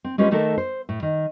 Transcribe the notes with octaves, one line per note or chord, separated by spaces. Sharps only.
C4
G#3 C#4 F4 G4 B4
D#3 A3 A#3 A4 A#4
C5
A2
D#3